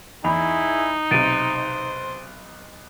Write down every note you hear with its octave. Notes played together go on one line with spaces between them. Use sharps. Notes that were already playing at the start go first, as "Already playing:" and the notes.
E2 D#4 E4 G#4 B5
B1 C3 C5 A6 D7 D#7